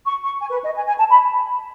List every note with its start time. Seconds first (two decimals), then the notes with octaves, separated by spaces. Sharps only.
0.06 C#6
0.23 C#6
0.41 G#5
0.51 B4
0.63 D#5
0.75 G#5
0.87 G#5
0.97 A5
1.09 B5